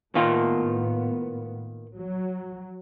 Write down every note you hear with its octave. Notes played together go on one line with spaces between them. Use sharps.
A2 D#3 A#3 B3 F4
F#3